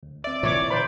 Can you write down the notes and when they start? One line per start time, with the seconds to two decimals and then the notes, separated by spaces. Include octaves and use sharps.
0.03 D2
0.24 C4 D5 E5
0.43 A#2 E3 C#5 D6
0.71 D3 C5 A#5 B5